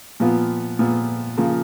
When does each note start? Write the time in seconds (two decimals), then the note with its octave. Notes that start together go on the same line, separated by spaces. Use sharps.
0.20 A#2 F3 B3 F4
0.79 A#2 F3 B3 F4
1.37 C#3 F3 A#3 F4